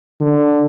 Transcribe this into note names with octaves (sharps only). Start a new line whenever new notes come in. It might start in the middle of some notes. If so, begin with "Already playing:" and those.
D3